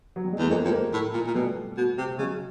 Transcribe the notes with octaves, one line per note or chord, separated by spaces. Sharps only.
F#3
G3
G#3
E2 A3
F2 G#3 A#3
F2
G#3 A#3
A2
A#2
A#2
B2 G3 A3
B2
C3
C#3 F#3 G#3